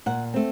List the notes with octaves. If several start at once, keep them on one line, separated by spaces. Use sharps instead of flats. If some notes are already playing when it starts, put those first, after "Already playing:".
A#2 F#5
A3 C4